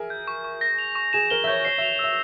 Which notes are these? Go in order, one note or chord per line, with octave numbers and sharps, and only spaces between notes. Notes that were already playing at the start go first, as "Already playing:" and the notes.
Already playing: G#4 A#4 E5
G6
C#6
C#6
A#6
F7
C#6
G#4 E7
A#4 G7
E5
C#5 G6
C#5 C7
E5 F7
E5 E6